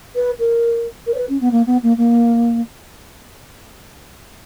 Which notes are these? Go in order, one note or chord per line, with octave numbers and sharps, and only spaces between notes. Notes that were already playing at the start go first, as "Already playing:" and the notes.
B4
A#4
A#4
C#5
B4
C#4
B3
A#3
B3
A#3
A#3